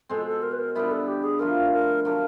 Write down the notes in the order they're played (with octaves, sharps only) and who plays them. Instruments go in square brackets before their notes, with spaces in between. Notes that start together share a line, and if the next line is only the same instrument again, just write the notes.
[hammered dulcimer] B2 G#3 C4 [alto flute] A4
[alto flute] A4
A#4
B4
A#4
[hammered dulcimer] D3 G3 B3 E4 [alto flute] A#4
[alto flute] A4
G4
G#4
[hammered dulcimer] F3 A3 D4 F4 [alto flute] A#4
[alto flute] A#4
[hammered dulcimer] F#3 A3 D4 G4 [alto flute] A#4